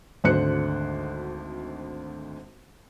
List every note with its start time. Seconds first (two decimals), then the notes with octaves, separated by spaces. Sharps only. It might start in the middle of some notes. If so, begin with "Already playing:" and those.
0.24 G#1 D2 D3 C5 F#6 C#7